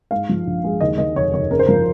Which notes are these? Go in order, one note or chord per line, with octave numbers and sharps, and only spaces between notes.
G#2 F5
F3
A#1
G#3
D#2 D#5
D#3 D#5
F1 C#5
F1 C#5
C#3 A#4
C5
F3 A#4